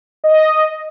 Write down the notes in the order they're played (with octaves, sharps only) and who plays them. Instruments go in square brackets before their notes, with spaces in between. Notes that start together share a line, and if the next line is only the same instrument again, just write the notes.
[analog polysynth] D#5